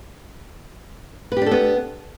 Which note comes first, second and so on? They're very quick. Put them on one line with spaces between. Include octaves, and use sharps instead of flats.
B4 G4 D4 A4 B3